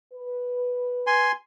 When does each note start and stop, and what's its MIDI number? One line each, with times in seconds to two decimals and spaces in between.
0.13 1.31 71
1.07 1.32 80
1.07 1.32 84